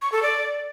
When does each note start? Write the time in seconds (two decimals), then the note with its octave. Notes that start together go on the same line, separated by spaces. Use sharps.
0.02 C#6
0.12 A4
0.23 D5